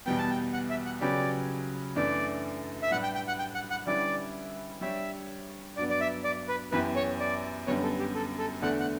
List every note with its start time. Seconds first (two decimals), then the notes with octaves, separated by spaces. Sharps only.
0.06 E2 B2 G3 B3 G5
0.18 A5
0.31 G5
0.53 F#5
0.70 E5
0.86 F#5
1.01 C#3 F#3 C#4 G4 B4 D5
1.96 F#2 E3 A3 D4 D5
2.82 E5
2.91 A2 G3 D4 G4 B4 F#5
3.03 G5
3.15 G5
3.28 F#5
3.39 G5
3.55 F#5
3.71 F#5
3.87 D3 G3 C#4 E4 B4 D5
4.81 G3 D4 G4 C#5 E5
5.77 G2 F#3 B3 D5
5.90 D5
6.01 E5
6.24 D5
6.48 B4
6.72 F#2 E3 B3 E4 G4 B4
6.96 C#5
7.20 D5
7.67 F#2 D3 G3 B3 C#5
7.83 A4
7.99 G4
8.15 A4
8.39 A4
8.62 E2 D3 A3 D4 A4 F#5
8.80 F#5